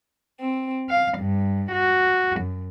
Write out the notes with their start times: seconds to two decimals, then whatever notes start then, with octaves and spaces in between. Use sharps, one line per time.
0.39 C4
0.89 F5
1.19 G2
1.72 F#4
2.40 F#2